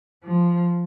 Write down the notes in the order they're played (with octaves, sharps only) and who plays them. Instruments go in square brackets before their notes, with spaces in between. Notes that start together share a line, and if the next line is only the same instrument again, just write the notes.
[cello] F3